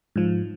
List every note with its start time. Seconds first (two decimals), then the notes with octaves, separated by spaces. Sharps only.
0.16 G#2 F3